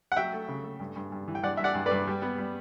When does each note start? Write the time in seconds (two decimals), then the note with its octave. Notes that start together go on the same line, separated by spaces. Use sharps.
0.12 F#5
0.16 F#3 E5 G5
0.33 A3
0.48 C#3
0.64 A3
0.80 G2
0.96 G2
1.12 G2
1.28 E3
1.35 G5
1.43 G2 D5 F#5
1.57 G2 E5
1.64 D5 F#5
1.75 G2
1.86 B4 D5
1.91 G2
2.07 G3
2.22 B3
2.38 G3